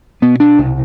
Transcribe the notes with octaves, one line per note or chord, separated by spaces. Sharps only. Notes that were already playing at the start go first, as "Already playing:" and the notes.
B2 B3
D4
C2